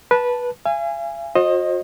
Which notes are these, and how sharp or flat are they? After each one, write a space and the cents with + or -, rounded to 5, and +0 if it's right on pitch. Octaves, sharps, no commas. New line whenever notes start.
B4 -15 A5 +0
F5 -45 G#5 -15
F#4 -45 C5 +35 D#5 +0